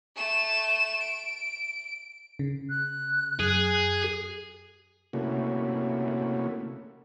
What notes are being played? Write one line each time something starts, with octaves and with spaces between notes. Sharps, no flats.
A3 E7
D7
C#3
F#6
F#2 G#4
C3 A3 A#3 C#4 E4 F#4